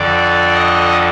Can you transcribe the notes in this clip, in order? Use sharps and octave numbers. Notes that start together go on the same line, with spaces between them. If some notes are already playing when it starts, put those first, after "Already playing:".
Already playing: F2 D3 D5
D#5